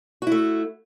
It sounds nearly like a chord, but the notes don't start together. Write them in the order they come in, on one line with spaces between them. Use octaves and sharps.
F#4 E4 A3